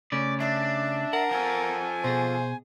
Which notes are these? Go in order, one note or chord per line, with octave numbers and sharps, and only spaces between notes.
C#3 A3 C#4 D5
D4 E5
A#4 F#5
F3 A4 G#5
B2 G#4 C5